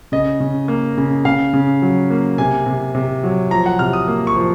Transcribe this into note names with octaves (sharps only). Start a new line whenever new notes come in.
C#3 D#5
C#3
A#3
C#3
C#3 F5
C#3
F#3
A#3
C3 G#5
C3
C3
F#3
F3 A#5
F#5
C3 F6
D#6
A#3
C#6
F3